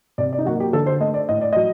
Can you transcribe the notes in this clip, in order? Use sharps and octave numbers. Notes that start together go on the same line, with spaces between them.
C3 D5
D5
D#4
F#3 A#3 F#4
G4
D3 A4
C5
A3 D#5
D5
A2 D#5
D5
F#3 D#5